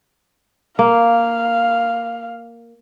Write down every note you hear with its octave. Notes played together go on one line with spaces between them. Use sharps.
A#3 F5